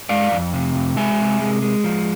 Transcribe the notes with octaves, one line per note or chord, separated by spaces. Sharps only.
G#3 D5 F5
F2
C3
F2
G#3 E5 G#5
C3
G#3
G#3
F3